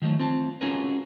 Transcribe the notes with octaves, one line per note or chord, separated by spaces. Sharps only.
D#3 F3 F#3 A3
C4 F4 A5
C#4 F4 F#4 G#4 A#4 B4